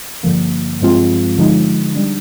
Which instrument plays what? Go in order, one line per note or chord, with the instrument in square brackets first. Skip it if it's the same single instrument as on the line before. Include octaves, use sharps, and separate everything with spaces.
[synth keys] G2 D3 F3 A#3
G2 F3 G#3 C4 F4
D3 F3 G#3 D#4
G3 D4